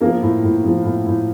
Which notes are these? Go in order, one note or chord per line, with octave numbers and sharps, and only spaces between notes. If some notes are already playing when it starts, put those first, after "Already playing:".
F3 A#3 A#4
A2
A2
F3
A2
A2